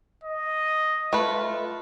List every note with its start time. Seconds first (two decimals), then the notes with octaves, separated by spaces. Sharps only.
0.23 D#5
1.13 A3 F4 B4